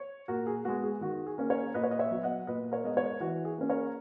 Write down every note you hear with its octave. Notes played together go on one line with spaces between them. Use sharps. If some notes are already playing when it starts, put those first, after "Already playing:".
Already playing: C#5
A#2 F#4 A#4
G#4
G#3 B3 F#4
G#4
D#3 F#4
G#4
A#3 C#4
A#4 C#5
A#2 B4 D#5
C#5
D#5
C#5 E5
F#3 B3
D#5 F#5
A#2 B4 D#5
A#4 C#5
G#3 B3 D#5
A#4 C#5
E3 F#4
G#4
A#3 C#4
A#4 C#5